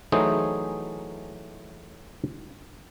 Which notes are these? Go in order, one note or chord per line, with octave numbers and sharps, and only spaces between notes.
E3 F#3 A3 D#4 G#4 C5